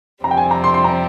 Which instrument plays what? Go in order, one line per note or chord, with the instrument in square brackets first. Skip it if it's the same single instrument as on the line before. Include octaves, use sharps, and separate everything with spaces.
[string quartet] F2 C3 G3 C4 [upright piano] A#5
[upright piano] G5
G#5
A#5
C6
C6
A#5